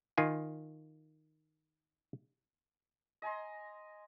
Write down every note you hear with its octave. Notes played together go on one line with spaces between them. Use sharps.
D#3 F4 G#5
D#5 G#5 A#5 C6